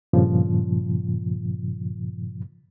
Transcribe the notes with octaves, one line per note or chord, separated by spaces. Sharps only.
G2 A#2 C#3 F3